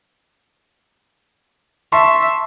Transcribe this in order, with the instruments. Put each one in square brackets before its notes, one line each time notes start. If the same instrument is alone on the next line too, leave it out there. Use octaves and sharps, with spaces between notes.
[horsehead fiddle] E5 [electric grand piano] A5 C6 C#6